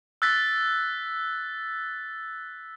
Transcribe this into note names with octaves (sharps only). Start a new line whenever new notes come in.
E6 F#6 A6 B6